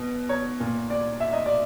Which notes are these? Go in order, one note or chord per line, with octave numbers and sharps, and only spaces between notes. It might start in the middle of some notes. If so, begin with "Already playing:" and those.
Already playing: B2
C#5
A#2
D5
E5
D#5
D5